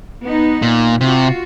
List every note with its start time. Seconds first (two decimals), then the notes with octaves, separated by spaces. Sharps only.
0.23 B3 D#4
0.62 A#2
1.01 C3 F4 F#4